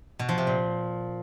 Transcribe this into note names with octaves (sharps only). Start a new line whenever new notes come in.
B2
F3
C3
A#2